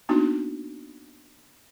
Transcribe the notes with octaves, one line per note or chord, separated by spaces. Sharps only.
A#3 B3 D4 D#4 F#4